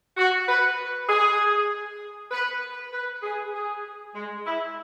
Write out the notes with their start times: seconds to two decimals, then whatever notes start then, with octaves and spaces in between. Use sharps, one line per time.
0.17 F#4
0.48 B4
1.09 G#4
2.31 B4
2.93 B4
3.23 G#4
3.54 G#4
4.15 G#3
4.46 E4